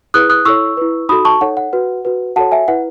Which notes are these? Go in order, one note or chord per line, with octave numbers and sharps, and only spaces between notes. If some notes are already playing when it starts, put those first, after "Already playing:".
E4 G#4 B4 D#6 F#6
D#6 F#6
E4 A4 C#5 C#6 E6
E4 B4
D#4 F#4 A4 B5 D#6
A5 C#6
D#4 A4 C#5 F#5
F#5
F#4 B4
F#4 B4
F#4 A4 C#5 F#5 A5
E5 G#5
E4 B4 F#5